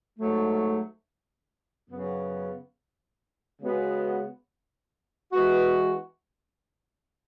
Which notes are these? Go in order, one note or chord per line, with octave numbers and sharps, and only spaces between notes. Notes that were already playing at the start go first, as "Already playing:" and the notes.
G#2 F#3 A3
F#2 C#3 F#3 B3
C#3 G#3 B3 F#4
E3 G#3 B3 F#4